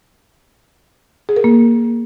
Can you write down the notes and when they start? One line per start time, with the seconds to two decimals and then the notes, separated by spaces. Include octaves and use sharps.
1.29 G#4
1.36 A#4
1.44 A#3